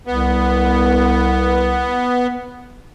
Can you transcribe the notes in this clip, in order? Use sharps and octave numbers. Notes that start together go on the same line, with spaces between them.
C2 B3